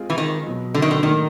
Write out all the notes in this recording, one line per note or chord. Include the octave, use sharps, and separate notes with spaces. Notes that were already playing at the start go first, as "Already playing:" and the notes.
Already playing: G#3 C4 F4 G#4
E3
D#3
B2 F#3 B3
D3
D#3
D3
A2 D#3 F#3 A#3